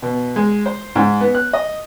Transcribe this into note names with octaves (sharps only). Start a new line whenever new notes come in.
B2
G#3
C5
G#2
B3
F#6
D#5